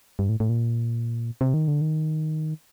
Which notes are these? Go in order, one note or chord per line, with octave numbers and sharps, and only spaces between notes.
G2
A2
A2
A#2
C3
D#3
D3
D#3